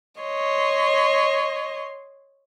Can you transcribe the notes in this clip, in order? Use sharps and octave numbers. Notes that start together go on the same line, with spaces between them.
C#5 D#5 C6